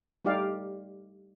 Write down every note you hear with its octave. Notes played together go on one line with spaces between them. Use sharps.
G3 A3 D#4 G4 D5 F5